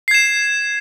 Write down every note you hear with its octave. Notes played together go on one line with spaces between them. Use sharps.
G#6 C7 E7